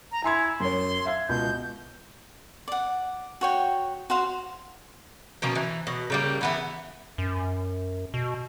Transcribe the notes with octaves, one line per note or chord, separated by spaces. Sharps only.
A#5
E4 G#5 C6 G#6
F#2 C#5 C6
E5 F5 G#6
C#2 B2 G6
D5 F#5
F#4 C#5 G5
F#4 C5 F5
B2 F3 A#3 C#4
E3
B2
C#3 G3 A#3
E3 B3 E4
F#2
B2